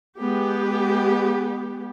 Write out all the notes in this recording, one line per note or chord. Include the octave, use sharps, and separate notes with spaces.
G#3 B3 G4